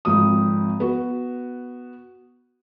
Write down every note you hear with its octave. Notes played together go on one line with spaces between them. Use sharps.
G#1 F2 D#6
B3 F#4